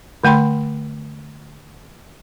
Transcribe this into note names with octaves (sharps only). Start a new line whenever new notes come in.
D3 A3 G5 B5 C6